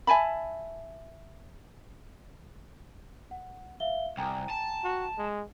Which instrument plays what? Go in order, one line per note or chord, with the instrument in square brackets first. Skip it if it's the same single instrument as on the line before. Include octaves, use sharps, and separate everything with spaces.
[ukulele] E5 G#5 A5 B5
[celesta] F#5
E5 F5 G7
[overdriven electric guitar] C2 [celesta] G5 G#5 A#5
[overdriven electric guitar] A5
[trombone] F#4
G#3